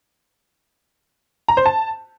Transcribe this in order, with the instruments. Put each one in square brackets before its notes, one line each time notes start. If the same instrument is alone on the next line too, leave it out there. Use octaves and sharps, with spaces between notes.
[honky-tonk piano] A#5
C5
A5